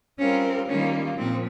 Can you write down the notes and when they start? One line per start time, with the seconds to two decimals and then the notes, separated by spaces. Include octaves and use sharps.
0.19 G3 C4 C#4 F4 A#4
0.68 D#3 G3 A#3 C#4 F4
1.17 A#2 F3 C4